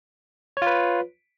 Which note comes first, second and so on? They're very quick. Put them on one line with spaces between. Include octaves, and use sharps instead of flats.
C#5 F4 B4